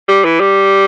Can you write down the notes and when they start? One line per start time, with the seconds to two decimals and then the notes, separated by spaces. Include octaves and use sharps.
0.08 G3
0.24 E3
0.40 G3